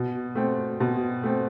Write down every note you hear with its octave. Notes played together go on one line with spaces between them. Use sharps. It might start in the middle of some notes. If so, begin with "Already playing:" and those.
Already playing: B2
A3 C4
B2
A3 C4